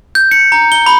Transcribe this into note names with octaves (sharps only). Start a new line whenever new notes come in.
G6
C#7
A#5
G7
B5